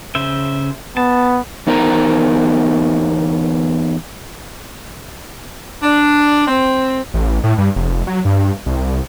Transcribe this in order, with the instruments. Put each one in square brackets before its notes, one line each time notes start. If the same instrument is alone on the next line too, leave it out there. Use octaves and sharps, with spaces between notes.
[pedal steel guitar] C#3 C5 E5
[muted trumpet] B3 [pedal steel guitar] A5
[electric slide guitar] E2 B3 D#4 A#4 C5 A#5
[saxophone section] D4
C4
[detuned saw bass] A1
A2
G2
F1
F#3
G2
C2